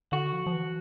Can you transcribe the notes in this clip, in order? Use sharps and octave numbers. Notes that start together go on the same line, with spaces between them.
D3 F#4
F3
F3
E3